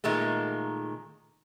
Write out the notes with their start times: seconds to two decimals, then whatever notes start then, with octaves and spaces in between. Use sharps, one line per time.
0.04 A#2 D#3 G#3 A3